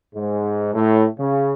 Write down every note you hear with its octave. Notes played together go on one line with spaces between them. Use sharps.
G#2
A2
C#3